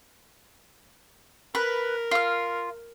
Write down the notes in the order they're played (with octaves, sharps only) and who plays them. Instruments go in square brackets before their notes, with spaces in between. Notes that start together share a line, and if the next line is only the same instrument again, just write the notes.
[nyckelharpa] A#4 [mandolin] B4
[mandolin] F4 F6